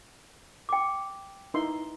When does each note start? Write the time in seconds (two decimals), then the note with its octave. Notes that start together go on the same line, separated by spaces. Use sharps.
0.69 G5 D6
1.54 D#4 E4 B4 C6